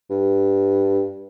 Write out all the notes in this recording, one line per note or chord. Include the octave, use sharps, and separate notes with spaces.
G2